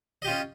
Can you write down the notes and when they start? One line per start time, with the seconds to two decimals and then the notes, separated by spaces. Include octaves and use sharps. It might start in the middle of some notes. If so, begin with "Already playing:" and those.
0.22 D#5
0.25 G4
0.27 F4
0.30 C#4